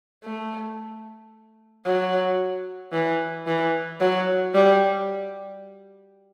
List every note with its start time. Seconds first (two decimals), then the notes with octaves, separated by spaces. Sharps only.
0.24 A3
1.85 F#3
2.93 E3
3.47 E3
4.00 F#3
4.54 G3